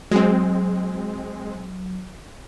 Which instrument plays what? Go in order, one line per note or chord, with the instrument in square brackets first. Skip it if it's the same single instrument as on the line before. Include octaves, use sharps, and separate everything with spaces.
[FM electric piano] F#3 [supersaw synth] G#3 C4